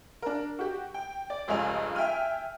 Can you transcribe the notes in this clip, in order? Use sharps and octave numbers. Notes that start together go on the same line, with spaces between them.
D4 A#4
F#4 G4
G5
D5
F1 C#2 G2 F4 G#5 F7
E5 G5 G#5 F6 D#7